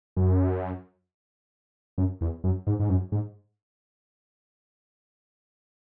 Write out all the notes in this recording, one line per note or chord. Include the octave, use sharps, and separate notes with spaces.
F#2
F#2
E2
F#2
G#2
G#2
F#2
G#2